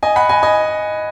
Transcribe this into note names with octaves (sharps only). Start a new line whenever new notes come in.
D#5 G#5
F#5 B5
D#5 G#5
D#5 G#5